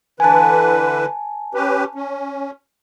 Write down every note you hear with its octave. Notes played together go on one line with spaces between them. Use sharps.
D3 E3 B4 G#5 A5
C#4 G4 B4
C#4